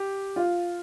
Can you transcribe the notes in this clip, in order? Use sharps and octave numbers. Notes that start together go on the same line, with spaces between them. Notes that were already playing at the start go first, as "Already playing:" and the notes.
Already playing: G4
F4